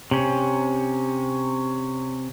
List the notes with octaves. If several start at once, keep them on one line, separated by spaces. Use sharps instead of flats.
C3 C#4